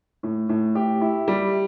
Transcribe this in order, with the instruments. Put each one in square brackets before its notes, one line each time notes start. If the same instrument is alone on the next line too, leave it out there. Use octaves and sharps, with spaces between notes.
[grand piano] A2
A2
G4
E4
G3